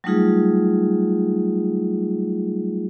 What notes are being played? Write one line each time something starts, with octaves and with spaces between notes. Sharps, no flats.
F#3 G3 A3 D#4 F4 G#4